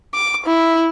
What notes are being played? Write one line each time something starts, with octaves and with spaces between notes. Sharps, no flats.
D6
E4